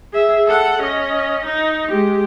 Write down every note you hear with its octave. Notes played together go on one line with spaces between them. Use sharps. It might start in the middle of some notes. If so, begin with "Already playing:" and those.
G#4 E5
A4 F#5
C#4 D#5
D#4
G#3 G4